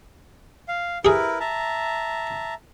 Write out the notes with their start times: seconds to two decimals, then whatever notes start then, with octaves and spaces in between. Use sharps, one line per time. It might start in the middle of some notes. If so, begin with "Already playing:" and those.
0.68 F5
1.05 E4 G4 G#4 A#4 B4
1.40 E5 A5 A#5